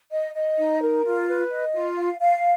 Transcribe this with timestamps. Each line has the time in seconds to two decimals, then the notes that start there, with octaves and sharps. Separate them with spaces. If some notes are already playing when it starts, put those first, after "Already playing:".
0.11 D#5
0.35 D#5
0.58 D#4
0.82 A#4
1.04 F4
1.28 B4
1.51 D#5
1.73 F4
1.97 F5
2.20 F5